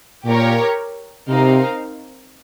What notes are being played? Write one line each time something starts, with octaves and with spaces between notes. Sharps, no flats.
A#2 G4 A#4 C#5
C3 C4 D#4 A#4 F5